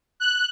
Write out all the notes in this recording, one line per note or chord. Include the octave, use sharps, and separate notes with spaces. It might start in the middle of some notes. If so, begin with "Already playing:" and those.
F#6